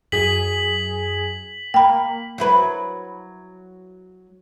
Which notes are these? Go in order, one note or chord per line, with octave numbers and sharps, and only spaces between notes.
F#2 G#4 G#5 B6 F#7
A#3 G5 B5
F#3 E4 B4